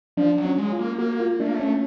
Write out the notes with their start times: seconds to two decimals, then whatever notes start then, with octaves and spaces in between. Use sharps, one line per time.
0.17 F3 D4
0.38 F#3
0.45 C#4
0.58 G#3
0.72 F4
0.79 A#3
0.98 A#3 F#4
1.20 F4
1.40 A3 D4
1.47 A#3
1.55 A3 C#4